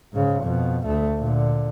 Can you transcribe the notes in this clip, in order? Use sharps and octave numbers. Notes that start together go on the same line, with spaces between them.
G#2 C#3
F2 B2
D2 A3
A#2 D3